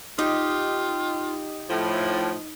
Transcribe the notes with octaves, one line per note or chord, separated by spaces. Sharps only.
D#4 F4 G4
A2 F3